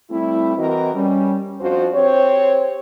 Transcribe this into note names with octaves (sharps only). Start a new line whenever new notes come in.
G3 A3 C4 E4
E3 C4 F#4 A#4 D#5
G3 C#4
F2 F3 D4 F4 F#4 C5
C4 G4 C5 C#5